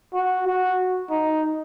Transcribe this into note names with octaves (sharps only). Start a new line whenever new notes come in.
F#4
F#4
D#4